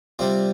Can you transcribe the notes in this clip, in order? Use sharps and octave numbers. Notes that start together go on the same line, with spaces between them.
C3 G3 C4 F4